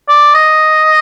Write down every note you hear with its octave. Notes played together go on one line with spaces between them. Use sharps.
D5
D#5